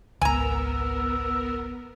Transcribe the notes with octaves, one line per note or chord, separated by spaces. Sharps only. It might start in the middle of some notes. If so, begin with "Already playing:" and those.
G#1 C#2 B3 A#4 G#5 A#5 E6